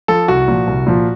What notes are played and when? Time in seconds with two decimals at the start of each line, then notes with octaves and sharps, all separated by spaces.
0.08 F3 A4
0.28 C2 F#4
0.48 A#2 F3
0.67 C2
0.87 A#2 F3